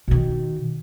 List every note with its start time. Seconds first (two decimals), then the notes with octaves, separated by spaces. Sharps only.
0.08 B2 D#3